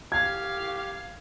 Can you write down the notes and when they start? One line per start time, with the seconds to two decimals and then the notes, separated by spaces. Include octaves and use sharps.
0.12 G4 F5 G#6